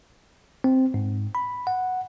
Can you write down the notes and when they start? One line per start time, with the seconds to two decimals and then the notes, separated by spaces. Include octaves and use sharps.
0.64 C4
0.94 G#2
1.35 B5
1.67 F#5